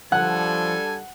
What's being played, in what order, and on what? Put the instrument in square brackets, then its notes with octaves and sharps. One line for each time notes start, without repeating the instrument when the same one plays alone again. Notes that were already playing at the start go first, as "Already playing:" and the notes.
[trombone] F3 [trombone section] G3 D4 A4 [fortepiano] F#5 F#6 [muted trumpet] G#5